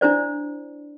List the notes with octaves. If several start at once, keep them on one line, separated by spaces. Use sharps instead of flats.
D4 E4 C5 D5